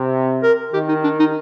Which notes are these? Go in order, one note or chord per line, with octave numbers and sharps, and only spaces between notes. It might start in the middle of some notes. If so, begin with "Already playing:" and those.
Already playing: C3
A#4
D#3 G4
D#4
D4
D#4